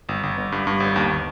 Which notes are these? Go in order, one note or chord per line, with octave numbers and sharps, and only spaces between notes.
G1
G1
G1
G2
G2
G1
D#2